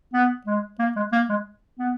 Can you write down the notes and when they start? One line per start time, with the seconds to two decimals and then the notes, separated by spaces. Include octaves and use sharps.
0.14 B3
0.47 G#3
0.79 A#3
0.96 G#3
1.12 A#3
1.29 G#3
1.79 B3